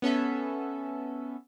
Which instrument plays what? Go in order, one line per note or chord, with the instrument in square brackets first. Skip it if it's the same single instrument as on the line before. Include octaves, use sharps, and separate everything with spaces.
[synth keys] B3 C#4 A4 E5